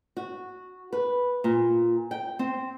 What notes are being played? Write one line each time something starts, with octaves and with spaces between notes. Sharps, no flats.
F#4
B4
A#2
G5
C4